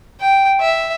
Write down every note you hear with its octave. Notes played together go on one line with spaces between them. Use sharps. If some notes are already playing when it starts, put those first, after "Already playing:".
G5
E5